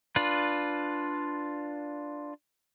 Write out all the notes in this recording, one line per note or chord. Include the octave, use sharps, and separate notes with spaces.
D4 F4 B4